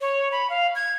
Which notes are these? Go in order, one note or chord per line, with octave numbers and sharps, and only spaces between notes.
C#5
B5
F5
G#6